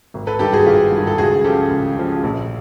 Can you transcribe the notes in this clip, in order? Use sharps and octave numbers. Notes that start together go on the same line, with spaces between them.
G#1
A4 B4
G2 D#3 G4 A4
F#4 G#4
G#1 F4 G4
G2
D#3
A4
C#2 F#4 G#4
C#3 F3 G4 A4
C#2
C#3 F3
A#1